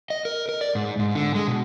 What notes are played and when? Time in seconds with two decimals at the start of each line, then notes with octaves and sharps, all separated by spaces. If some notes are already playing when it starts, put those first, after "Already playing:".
0.10 D#5
0.25 A#4
0.49 A#4
0.61 D5
0.75 G#2
0.99 G#2
1.15 D3
1.35 G#3
1.47 B2